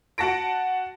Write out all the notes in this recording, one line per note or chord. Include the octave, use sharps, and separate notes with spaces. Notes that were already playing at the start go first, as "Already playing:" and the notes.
F#4 F#5 A5 A#6 D7